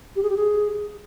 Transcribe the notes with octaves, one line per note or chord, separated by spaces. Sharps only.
G4
G#4
G4
G#4